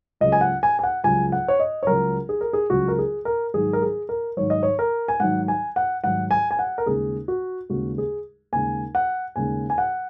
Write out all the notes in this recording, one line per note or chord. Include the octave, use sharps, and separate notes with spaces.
C#2 C#3 F#3 D#5
G#5
F#5
G#5
G#5
F#5
C#2 C#3 F#3 G#5
F#5
C#5
D#5
C#5
C#2 C#3 F#3 A#4
G#4
A#4
G#4
C#2 C#3 F#3 F#4
A#4
G#4
A#4
G#2 D#3 F#3 G#4
A#4
G#4
A#4
G#2 D#3 F#3 C#5
D#5
C#5
A#4
G#5
G#2 D#3 F#3 F#5
G#5
F#5
G#2 D#3 F#3 F#5
G#5
G#5
F#5
A#4
D#2 C#3 G#3 G#4
F#4
D#2 C#3 G#3 F#4
G#4
D#2 C#3 G#3 G#5
F#5
D#2 C#3 G#3 G#5
G#5
F#5